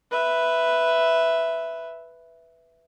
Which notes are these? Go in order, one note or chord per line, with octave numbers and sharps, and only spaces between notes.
B4 E5